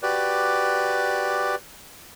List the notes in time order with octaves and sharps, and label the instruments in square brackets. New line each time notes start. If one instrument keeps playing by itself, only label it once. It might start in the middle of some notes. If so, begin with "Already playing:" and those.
[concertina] F#4 G4 B4 D5